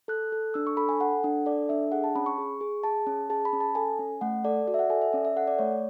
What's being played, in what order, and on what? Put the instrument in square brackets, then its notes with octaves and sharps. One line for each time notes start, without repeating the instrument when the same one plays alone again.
[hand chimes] A4 F#6
A4
D4 E6
C#6
A4 B5
G#5
A4 F#5
D4
A4 D5
D4 E5
G#4 F#5
A5
C#4 B5
C#6
G#4
G#4
G#4 A5
C#4
G#4 A5
B5
C#4
A5
A4 G#5
C#4
A3 F#5
A4 D5
F#4 D5
E5
F#5
A4 G#5
E5
C#4 D5
E5
A4 F#5
D5
A3 C#5